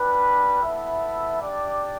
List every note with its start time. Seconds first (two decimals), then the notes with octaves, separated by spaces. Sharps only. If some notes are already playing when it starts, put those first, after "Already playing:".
Already playing: G3 D4 B4
0.63 B3 E4 A4 E5
1.41 D4 G4 D5